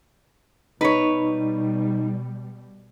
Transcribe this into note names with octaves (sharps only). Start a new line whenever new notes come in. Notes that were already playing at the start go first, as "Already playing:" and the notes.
B2 G3 D#4 B4 C#5